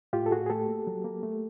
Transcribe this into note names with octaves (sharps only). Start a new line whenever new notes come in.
A2 F4 G4
A4
A2 F#4 G#4
G#4
A3 G4 A4
A#3
F#3
A#3
A3